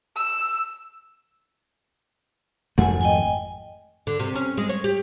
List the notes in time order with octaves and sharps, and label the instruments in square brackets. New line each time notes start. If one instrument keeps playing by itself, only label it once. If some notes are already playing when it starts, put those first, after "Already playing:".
[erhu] E6
[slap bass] G#1 F2 A3 [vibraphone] F#5 G#5
[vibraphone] D#5 G5 G#5
[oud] D3
C3
C#4
G#3
C#5
G4